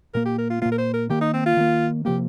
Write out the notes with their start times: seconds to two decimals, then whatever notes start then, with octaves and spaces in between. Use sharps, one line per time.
0.14 A#2 A#3 A#4
0.26 G4
0.38 A#4
0.50 F4
0.62 A#2 A#3 F4
0.72 A#4
0.78 C5
0.94 A#4
1.09 D#3 A#3 G4
1.21 D#4
1.34 C4
1.46 F4
1.57 D#3 A#3
2.05 C3 F3 A#3 G4